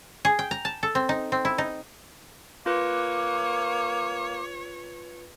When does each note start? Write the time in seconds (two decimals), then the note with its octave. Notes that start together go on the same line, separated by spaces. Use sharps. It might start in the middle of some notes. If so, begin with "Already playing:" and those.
0.25 G#4
0.39 G5
0.51 A#5
0.65 A5
0.83 A4
0.95 C4
1.09 D#4
1.32 C4
1.45 E4
1.58 D#4
2.66 A#3 F4 B4 C#5 D6